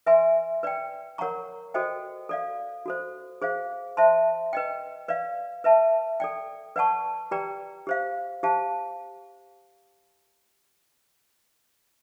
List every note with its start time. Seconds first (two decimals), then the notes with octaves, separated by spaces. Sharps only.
0.06 B4 E5 G#5 C6
0.63 B4 D5 G5
1.18 A#4 C#5 F#5 A#5 C#6
1.74 F#4 A4 C5 D#5 G5
2.29 A4 D5 F5
2.86 F#4 A4 C5
3.42 G#4 C5 F5
3.97 C5 E5 A5 C6
4.53 B4 D#5 G5
5.08 B4 D5 F5
5.64 B4 E5 A5
6.20 A4 D5 G5
6.76 B4 D5 F#5 A5 C#6
7.31 G4 B4 D5 G5 A#5
7.87 G4 C5 F5
8.43 G4 C5 F5 A5